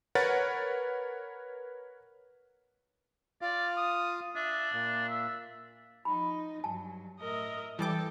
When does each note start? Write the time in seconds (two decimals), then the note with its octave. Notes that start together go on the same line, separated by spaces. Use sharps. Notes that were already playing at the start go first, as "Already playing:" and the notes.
0.15 A#4 B4 C#5 F#5 A6
3.42 F4 D5 F5
3.77 D#6
4.36 D4 E5
4.73 A#2
5.09 E5
6.05 F3 D#4 B5
6.64 G2 F#3 A5
7.20 A2 A#4 D#5 E5
7.79 E3 G3 A4 G5 A5 D6